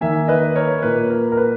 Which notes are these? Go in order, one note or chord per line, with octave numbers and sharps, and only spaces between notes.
D#3 A#3 E5 G#5
B4 D#5
A#4 C#5
A#2 A#3 B4
A#4
A#4
B4